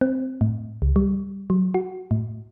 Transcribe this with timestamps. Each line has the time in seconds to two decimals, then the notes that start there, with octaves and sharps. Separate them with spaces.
0.01 C4
0.41 A2
0.82 C#2
0.96 G3
1.50 F#3
1.74 F#4
2.11 A2